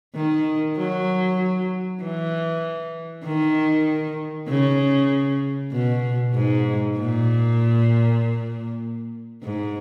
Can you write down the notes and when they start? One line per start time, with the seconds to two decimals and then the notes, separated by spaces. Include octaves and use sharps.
0.15 D#3
0.77 F#3
2.01 E3
3.25 D#3
4.48 C#3
5.72 B2
6.35 G#2
6.96 A#2
9.44 G#2